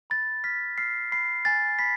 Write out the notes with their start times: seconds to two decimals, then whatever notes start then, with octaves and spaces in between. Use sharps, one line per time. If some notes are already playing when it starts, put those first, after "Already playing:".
0.10 B5 A6
0.44 F6 B6
0.78 F6 C7
1.12 B5 C7
1.45 G#5 A6
1.79 B5 B6